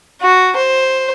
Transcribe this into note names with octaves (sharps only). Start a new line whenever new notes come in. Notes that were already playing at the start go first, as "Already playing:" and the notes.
F#4
C5